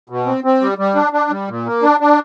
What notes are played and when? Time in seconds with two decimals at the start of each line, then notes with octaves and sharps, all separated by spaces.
0.10 B2
0.26 C4
0.44 C4
0.61 G3
0.78 G3
0.95 D4
1.13 D4
1.30 G3
1.49 A#2
1.66 A#3
1.83 D4
2.00 D4